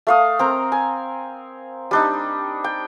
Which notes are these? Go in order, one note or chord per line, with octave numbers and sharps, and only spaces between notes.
A3 F5 D#6
C4 A#4 A#5
G#5
G3 D4 D#4
G5